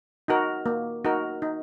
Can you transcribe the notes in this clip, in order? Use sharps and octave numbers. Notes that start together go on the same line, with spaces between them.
D#4 F#4 A#4
A#3
D#4 F#4 A#4
D#4